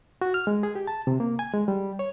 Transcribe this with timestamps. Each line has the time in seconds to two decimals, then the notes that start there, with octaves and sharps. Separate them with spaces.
0.21 F#4
0.34 F6
0.47 G#3
0.63 G#4
0.75 G4
0.87 A5
1.07 C3
1.20 A#3
1.39 G#5
1.54 G#3
1.68 G3
1.99 C#5